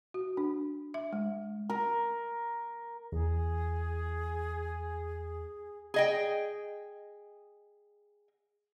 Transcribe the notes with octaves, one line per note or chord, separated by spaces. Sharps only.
F#4
D4
E5
G#3
A#4
E2 G#4
G#4 D#5 G5